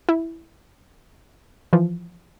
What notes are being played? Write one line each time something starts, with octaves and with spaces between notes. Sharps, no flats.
E4
E3 F3